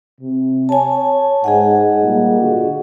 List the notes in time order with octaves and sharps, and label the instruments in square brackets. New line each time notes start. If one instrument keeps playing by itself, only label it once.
[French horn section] C3
[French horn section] C#5 [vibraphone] G#5 A5
[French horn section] G#2 [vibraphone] G#4 D#5 F#5
[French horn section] A#2 G3 A#3
D3 F4 F#4